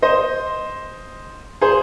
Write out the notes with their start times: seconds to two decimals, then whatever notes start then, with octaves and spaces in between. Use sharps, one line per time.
0.02 C5 D#5
1.61 G#4 C5